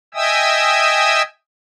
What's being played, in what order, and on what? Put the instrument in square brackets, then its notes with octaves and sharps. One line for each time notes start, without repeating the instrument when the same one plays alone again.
[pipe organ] D#5 E5 G5 G#5 D#6 E6